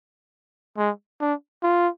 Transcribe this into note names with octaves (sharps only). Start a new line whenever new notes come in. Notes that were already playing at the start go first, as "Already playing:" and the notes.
G#3
D4
F4